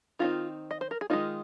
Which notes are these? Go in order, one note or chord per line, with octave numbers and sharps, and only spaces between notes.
D#3 G#3 C4 D#4 F4
D#5
C5
A#4
G#4
D#3 G#3 C4 D#4 F4